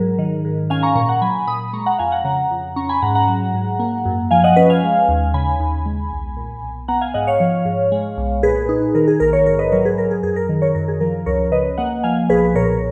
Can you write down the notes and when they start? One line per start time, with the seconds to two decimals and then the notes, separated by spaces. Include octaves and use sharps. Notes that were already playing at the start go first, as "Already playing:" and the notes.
Already playing: G#2 F#3 A#4
0.19 D#3
0.45 G#2
0.70 C#4 F5 G#5
0.83 A#5 C#6
0.96 A#2 A#5 C#6
1.09 F#5 A#5
1.22 F#3 G#5 B5
1.47 A#2 B5 D#6
1.73 G#3 A#5 C#6
1.86 F#5 A#5
1.99 F2 F5 G#5
2.12 F#5 A#5
2.25 C#3 F#5 A#5
2.51 F2
2.76 C#4 A#5 C#6
2.89 G#5 B5
3.02 G#2 F#5 A#5
3.15 F#5 A#5
3.28 F#3
3.54 G#2
3.79 A#3
4.05 F#2
4.31 F3 F5 G#5
4.44 D#5 F#5
4.56 C#4 B4 D#5
4.70 F5 G#5
4.83 G#3
5.08 D#2
5.34 C#3 G#5 B5
5.60 D#2
5.86 G#3
6.11 B1
6.37 A#2
6.63 B1
6.88 B3 F#5 A#5
7.01 F5 G#5
7.14 G#2 D#5 F#5
7.27 C#5 F5
7.40 F3
7.65 G#2
7.92 G#3
8.17 B1
8.43 A#2 G#4 B4
8.69 D#4
8.95 D#3 A#4
9.08 G#4
9.20 A#1 A#4
9.33 A#4 C#5
9.46 G#2 A#4 C#5
9.59 B4 D#5
9.72 F#3 A#4 C#5
9.85 G#4 B4
9.98 F#3 A#4
10.11 G#4
10.23 F#2 G#4
10.36 A#4
10.49 D#3
10.62 A#4 C#5
10.75 F#2 A#4
10.88 G#4
11.00 F3 A#4
11.26 C#2 A#4 C#5
11.52 C#3 B4 D#5
11.78 A#3 D#5 F#5
12.04 F3 F5 G#5
12.29 B1 G#4 B4
12.45 B4
12.55 A#2 A#4 C#5